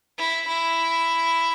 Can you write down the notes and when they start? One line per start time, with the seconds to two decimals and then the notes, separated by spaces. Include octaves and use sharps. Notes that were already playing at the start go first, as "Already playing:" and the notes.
0.18 E4
0.47 E4